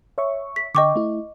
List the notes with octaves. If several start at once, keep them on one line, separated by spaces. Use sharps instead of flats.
C#5 E5 C#6
B6
D3 D#5 G5 C#6 D6
A3 E4